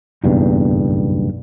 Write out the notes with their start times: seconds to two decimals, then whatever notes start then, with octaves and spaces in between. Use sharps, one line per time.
0.24 F#1 B1 E2 G2